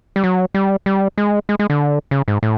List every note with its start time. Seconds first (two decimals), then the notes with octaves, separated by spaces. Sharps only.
0.16 G3
0.24 F#3
0.54 G3
0.86 G3
1.18 G#3
1.49 G#3
1.59 G#3
1.70 D3
2.11 C#3
2.28 G#2
2.43 A2